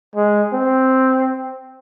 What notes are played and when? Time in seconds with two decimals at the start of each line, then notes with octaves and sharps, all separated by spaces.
0.16 G#3
0.53 C4